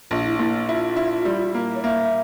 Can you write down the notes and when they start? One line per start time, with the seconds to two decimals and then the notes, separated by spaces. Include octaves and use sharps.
0.11 A#1 F4
0.25 E4
0.39 A#2 E4
0.68 E4 F4
0.96 E4
1.25 G3
1.54 A#3
1.75 C#5
1.83 A#3 E5